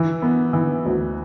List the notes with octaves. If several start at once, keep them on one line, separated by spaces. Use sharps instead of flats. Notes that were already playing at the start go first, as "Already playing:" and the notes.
Already playing: E3
B3
E3
D2